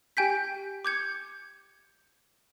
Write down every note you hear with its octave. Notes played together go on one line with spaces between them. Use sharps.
G4 G5 G#5 G6 B6
D6 G6 G#6 C#7